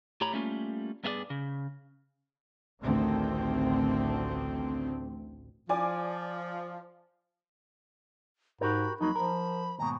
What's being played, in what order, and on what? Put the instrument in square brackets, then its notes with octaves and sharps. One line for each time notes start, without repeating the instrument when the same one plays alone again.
[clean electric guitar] A2 G4 C#5 A#5 B5
G3 A3 A#3 C#4 F4
G2 B3 D#4 F#4 G#4 D5
C#3
[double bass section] A1 D2 D3 D#3 A3 C4
[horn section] F3 [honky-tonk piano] D5 G#5 D6
[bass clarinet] G#2 [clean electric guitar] F#4 G4 A#4 [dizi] B5
[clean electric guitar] F2 F#3 A#3 [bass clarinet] D#4 [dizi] B5
[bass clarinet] F3 [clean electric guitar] A#4
[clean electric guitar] D#2 G#2 B2 [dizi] A#5